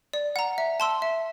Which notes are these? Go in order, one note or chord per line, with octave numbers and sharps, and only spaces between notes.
D5
F#5 A#5
E5
A5 C6 E6
E5